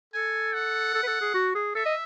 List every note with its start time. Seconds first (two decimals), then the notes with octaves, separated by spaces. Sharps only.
0.14 A4 G#5
0.53 F#5
0.94 A4
1.03 B4
1.07 A4
1.21 G#4
1.34 F#4
1.55 G#4
1.75 A4 E5
1.86 D#5